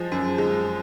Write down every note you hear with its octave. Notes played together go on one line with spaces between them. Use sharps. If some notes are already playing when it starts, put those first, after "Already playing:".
Already playing: F3 G#3 C4
F#2
G#3